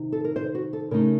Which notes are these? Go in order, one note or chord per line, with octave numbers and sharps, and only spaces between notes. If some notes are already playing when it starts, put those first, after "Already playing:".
Already playing: C3 D#3 D#4
A4
A#4
C5
F#4
A4
C#3 A3 D#4 A#4